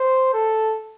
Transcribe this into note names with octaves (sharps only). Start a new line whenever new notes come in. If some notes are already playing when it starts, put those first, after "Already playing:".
Already playing: C5
A4